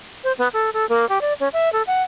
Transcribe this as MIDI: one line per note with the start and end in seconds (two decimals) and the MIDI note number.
0.24 0.33 72
0.38 0.48 59
0.53 0.70 69
0.74 0.88 69
0.89 1.07 58
1.09 1.21 67
1.21 1.33 74
1.40 1.48 61
1.53 1.72 76
1.73 1.82 69
1.87 2.03 78